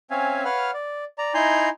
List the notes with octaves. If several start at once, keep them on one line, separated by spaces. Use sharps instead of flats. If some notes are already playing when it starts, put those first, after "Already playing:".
C4 C#4 C#5 E5 F5 G#5
B4 C#5 F5 F#5 F6
D5
D5 A#5
D#4 E4 G#5 A#5 C6 G6